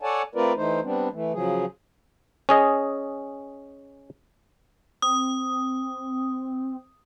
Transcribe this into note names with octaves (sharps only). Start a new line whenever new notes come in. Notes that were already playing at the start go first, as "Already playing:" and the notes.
A4 C#5 D5 F#5 G#5 A5
A3 C4 F4 A#4 B4 D5
E3 A3 D#4 C5
G3 B3 C4 D4
E3 A3
C#3 F3 F#3 G#4
C#4 G#4 D#5
C4 D#6